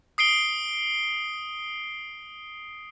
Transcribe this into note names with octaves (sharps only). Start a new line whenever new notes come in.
D#6 C7 D7 G7